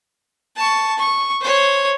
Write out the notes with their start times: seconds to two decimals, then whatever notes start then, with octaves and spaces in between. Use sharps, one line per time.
0.56 A5 C#6
0.97 C#6
1.40 C5 C#5